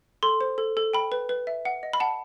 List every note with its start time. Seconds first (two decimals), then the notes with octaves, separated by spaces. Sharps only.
0.23 A4 C6
0.41 C5
0.58 A4
0.77 A4
0.93 G5 B5
1.12 B4
1.29 B4
1.47 E5
1.65 F#5
1.83 D#5
1.93 B5
2.00 F#5 A5